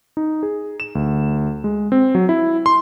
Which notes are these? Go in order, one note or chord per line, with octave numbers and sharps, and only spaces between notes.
D#4
G#4
E7
D2
G#3
C4
F#3
E4
C6